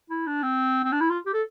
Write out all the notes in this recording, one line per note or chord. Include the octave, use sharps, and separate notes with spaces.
E4
D4
C4
C4
D4
E4
F4
G4
A4